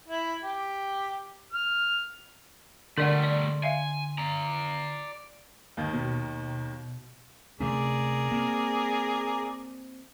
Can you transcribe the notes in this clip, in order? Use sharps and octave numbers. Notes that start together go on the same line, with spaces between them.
E4
G4
F6
D3 G3 A3 A#4 D5 F#5 C6
D5
E5 F5 G#5
D5 A#5
D#2 D#3
B2
C3 A3 C#4 G#4 A#4 D5
A#3 C4